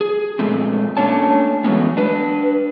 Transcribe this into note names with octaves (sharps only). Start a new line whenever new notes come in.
G#4
A#2 F3 G#3 A3 C4
A3 A#3 C#4 D4 C#5 A5
E3 F#3 G#3 A3 B3 C#4
D4 B4